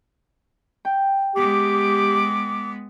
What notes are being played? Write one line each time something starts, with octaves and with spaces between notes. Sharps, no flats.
G5
G#3 B3 G4 D6